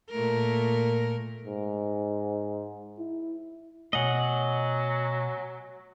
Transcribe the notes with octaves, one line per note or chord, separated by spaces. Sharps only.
A#2 A3 A#4
G#2
E4
B2 F#3 A3 C#5 D#5 F#5 G#5